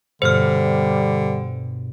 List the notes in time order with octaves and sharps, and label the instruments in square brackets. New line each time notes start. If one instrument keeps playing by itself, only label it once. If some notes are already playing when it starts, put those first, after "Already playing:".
[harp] G2 B2 [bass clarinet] D3 [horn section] G3 [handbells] C5 F6